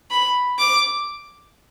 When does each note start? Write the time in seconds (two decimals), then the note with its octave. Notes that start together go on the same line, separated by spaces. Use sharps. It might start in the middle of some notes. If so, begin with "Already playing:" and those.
0.11 B5
0.59 D6